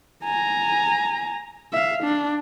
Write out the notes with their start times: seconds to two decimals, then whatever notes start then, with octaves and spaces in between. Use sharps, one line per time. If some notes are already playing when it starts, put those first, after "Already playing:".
0.24 G#5 A#5
1.73 E5 F5
2.04 D4